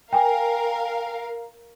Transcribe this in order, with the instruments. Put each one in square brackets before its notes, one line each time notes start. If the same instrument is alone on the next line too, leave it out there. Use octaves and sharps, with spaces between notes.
[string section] A#4 F5 [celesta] G5 G#5